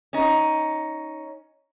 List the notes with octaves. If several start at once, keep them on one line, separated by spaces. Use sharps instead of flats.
C#4 D#4